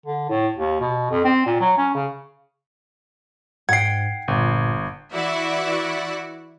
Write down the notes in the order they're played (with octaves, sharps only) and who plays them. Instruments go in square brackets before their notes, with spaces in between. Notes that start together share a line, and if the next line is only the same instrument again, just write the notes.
[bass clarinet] D3
A2
D#2
B2
F2
C4
A#2
F#3
C#4
C#3
[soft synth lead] G#2 [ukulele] F#5 G5 [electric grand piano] G#6 C7
[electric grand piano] G1 [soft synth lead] A#2
[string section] E3 E4 F#4 D5 E5 F#5